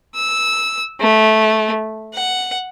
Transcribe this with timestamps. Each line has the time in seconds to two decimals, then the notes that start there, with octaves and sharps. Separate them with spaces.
0.16 E6
1.01 A3
2.14 F#5